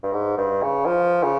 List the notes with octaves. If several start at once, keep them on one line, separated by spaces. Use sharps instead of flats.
G2
G#2
G2
C#3
F3
C#3